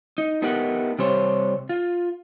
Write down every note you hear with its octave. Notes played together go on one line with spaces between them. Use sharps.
D#4
A3 B3 D#4 G4 A#4 F#5
C3 G3 C5 C#5
F4